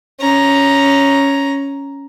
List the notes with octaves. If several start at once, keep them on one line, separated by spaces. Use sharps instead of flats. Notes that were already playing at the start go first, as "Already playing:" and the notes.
C#4 A#5